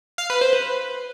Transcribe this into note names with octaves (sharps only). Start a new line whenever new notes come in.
F5
B4
C5
B4